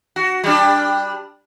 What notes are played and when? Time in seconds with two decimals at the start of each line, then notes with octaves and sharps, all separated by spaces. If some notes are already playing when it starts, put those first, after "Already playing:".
0.16 F#4
0.44 G3 D4